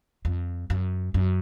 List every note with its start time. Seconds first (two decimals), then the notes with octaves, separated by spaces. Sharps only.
0.25 F2
0.70 F#2
1.14 F#2